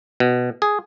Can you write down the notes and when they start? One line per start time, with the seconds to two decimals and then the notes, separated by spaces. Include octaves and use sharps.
0.20 B2
0.62 G#4